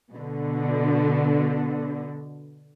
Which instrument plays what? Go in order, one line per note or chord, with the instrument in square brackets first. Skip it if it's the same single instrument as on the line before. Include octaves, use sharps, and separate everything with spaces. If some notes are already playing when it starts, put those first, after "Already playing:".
[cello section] B2 D3